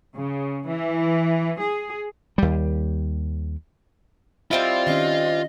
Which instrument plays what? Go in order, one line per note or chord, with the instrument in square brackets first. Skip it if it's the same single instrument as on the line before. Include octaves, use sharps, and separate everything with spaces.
[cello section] C#3
E3
G#4
[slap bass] D#2 G3
[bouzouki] G3 C4 E4 [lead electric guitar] F4 [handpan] D#5 E5
[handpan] D#3 C#4 [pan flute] D#5